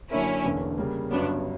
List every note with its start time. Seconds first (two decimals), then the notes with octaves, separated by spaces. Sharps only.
0.10 F#2 D3 A#3 C#4 D4 E4 A#4
0.44 E1 E2 D3 A#3 C#4
0.78 C#3 G3 A#3
1.11 G1 G2 F#3 B3 C#4 D4